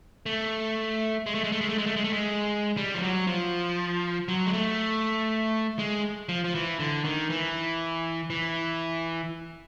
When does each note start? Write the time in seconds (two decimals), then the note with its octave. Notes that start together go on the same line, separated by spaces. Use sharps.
0.26 A3
1.26 G#3
1.35 A3
1.44 G#3
1.52 A3
1.61 G#3
1.69 A3
1.78 G#3
1.86 A3
1.96 G#3
2.04 A3
2.13 G#3
2.77 G3
2.95 F3
3.02 F#3
3.27 F3
4.28 F#3
4.46 G#3
4.53 A3
5.79 G#3
6.29 F3
6.44 F3
6.55 E3
6.79 D3
7.04 D#3
7.30 E3
8.30 E3